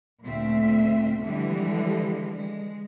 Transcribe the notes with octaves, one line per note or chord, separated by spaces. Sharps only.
D2 A#2 A3 C4 E5
D3 E3 F3 G3 G#3
G#3